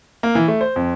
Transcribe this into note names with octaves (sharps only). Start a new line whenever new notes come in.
A#3
E3
A3
C5
F2